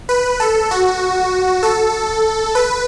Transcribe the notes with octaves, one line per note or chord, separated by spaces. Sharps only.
B4
A4
F#4
A4
B4